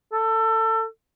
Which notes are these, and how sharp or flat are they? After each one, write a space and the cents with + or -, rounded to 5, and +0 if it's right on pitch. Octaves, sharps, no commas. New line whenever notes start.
A4 +25